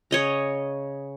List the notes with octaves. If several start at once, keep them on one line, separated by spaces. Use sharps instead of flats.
C#3 C#5 D#5 A#5